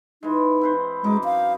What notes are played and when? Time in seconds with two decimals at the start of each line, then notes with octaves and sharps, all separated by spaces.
0.23 E3 G#3 D#4
0.61 C4 B4 C5
1.04 F#2 G#3 D#4 D6
1.24 F5